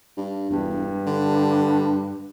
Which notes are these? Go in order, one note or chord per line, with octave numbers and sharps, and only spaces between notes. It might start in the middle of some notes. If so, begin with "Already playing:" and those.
G2
E1 G2
D3